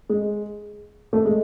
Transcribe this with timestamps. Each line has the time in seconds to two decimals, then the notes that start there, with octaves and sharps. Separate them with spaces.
0.10 G#3
1.13 A3
1.25 G#3